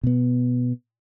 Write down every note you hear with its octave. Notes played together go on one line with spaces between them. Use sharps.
B2 B3